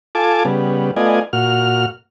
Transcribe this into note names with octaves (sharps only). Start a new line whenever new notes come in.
F4 A4 G#5 A5 D6
C#3 G3 B3
A3 B3 F4 D5 D#5 G#5
A#2 F#4 F6